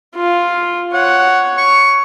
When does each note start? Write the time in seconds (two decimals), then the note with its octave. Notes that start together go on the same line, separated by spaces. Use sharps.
0.15 F4
0.94 C#5 F#5
1.58 C#6